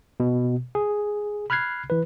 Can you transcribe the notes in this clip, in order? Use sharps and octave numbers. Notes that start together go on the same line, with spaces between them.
B2
G#4
B5 F6 F#6 G#6 C7
E3 B4